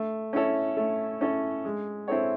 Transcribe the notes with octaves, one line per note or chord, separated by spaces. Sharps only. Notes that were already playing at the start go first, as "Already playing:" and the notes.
Already playing: A3
C#4 E4 A4 C#5
A3
C#4 E4 A4 C#5
G#3
C4 E4 A4 C#5